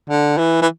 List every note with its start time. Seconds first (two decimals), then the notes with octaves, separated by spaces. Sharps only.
0.10 D3
0.38 E3
0.62 E3